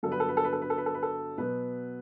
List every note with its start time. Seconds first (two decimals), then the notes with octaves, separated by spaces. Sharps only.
0.03 G2 D3 F#3 B3 A4
0.12 B4
0.20 A4
0.29 B4
0.37 A4
0.44 B4
0.53 A4
0.62 B4
0.70 A4
0.78 B4
0.86 A4
0.94 B4
1.03 A4
1.38 B2 F#3 B3 B4